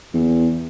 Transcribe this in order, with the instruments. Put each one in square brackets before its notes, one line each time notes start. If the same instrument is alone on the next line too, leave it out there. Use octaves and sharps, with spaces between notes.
[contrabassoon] E2